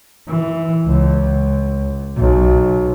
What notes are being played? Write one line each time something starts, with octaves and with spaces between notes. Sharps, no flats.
E3
C#2
B1